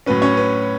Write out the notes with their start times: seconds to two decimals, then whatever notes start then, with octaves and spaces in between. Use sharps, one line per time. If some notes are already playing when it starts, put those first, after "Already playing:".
0.06 A2 F#3 C#4 B4
0.22 C#4 C#5
0.37 B4